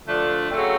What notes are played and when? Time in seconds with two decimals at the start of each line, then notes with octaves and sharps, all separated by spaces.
0.05 D3 F3 A3 D4
0.51 C#3 F#3 A3 C4